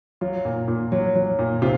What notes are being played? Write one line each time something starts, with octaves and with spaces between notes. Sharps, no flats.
F#3 F4
A#2
A#2
F#3
F#3
A#2
C3 F4